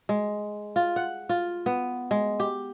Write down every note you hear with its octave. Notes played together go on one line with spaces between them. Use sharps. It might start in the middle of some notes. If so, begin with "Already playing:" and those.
G#3
F4
F#5
F4
B3
G#3
G4